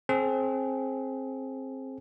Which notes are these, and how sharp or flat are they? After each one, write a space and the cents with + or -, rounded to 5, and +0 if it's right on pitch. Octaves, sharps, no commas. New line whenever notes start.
C4 +20 G#4 +35